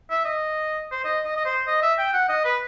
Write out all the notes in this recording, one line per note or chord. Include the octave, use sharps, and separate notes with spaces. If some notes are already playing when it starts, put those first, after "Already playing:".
E5
D#5
C5
D#5
D#5
D#5
C5
D#5
E5
G5
F#5
D#5
B4